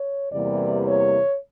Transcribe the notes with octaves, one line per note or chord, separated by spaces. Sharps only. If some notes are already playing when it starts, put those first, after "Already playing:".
Already playing: C#5
E2 C3 E3 G3 A#3 D5
C#5